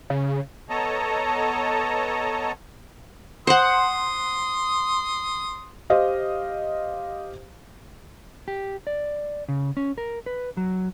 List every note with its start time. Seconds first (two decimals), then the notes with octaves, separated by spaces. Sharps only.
0.10 C#3
0.69 B3 A4 C#5 D#5 A5 A#5
3.47 C5 F#5 C6 D#6
5.90 G4 C5 D#5 F5
8.48 G4
8.87 D5
9.48 C#3
9.77 C#4
9.98 A#4
10.26 B4
10.57 F#3